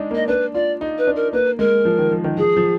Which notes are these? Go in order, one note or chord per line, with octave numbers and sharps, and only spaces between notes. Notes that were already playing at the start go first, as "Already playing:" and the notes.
Already playing: G#3 D4 D#4
A#3 D#5
D4 B4
F4 D5
D#4
B4
D4
A#4
A#3 B4
G#3 A#4
F3
D#3
F3
D#3
F3 G#4
F3